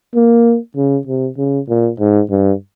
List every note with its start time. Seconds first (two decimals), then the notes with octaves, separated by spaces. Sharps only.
0.15 A#3
0.77 C#3
1.07 C3
1.38 C#3
1.69 A#2
2.00 G#2
2.30 G2